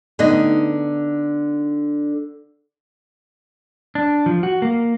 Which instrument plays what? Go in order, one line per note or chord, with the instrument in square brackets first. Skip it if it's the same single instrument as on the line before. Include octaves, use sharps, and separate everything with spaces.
[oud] D3 B3 D#4
[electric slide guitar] D4
F3
F#4
A#3